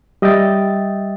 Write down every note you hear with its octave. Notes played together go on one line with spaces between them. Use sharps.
G3 D#5 E5 G5 A6